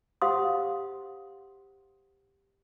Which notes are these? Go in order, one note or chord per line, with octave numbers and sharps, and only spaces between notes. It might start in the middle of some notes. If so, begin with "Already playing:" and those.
G4 C5 F5 F#5 C6 D#6